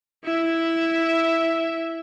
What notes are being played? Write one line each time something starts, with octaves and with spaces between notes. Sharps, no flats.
E4 E5